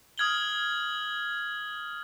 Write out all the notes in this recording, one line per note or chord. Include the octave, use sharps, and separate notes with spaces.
D#6 F6 G#6 F#7 G7